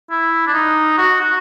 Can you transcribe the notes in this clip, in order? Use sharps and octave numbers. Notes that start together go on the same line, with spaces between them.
E4
D4
D#4
F#4
F#4